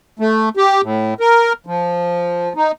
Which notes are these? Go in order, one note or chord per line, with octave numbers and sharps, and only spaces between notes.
A3
G4
A2
A#4
F3
D#4